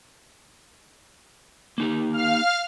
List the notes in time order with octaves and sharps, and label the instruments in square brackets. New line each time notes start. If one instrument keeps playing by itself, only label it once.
[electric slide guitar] A#3 D#4 G4
[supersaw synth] F5 F6